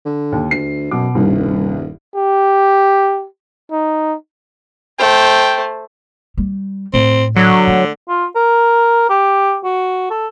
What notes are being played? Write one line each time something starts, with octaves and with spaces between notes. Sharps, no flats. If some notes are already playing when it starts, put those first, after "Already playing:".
D3
D#2
D2 C7
F#2 B2 D6
D#1 C2 G2
G4
D#4
A3 C5 G5
G3
A2 C4
D3 F#3
A3
F4
A#4
G4
F#4
A4